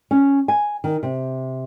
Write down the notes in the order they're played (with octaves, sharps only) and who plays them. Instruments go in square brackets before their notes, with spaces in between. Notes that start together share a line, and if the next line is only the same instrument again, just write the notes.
[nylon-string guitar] C#4
G#5
D#3
C3